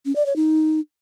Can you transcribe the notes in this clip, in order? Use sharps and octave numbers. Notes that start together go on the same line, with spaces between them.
C#4
D5
C#5
D#4